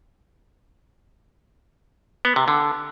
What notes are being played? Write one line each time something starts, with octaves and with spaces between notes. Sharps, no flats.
B3
C3
D3